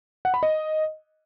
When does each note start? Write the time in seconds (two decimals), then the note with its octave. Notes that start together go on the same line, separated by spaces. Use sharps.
0.25 F#5
0.34 B5
0.43 D#5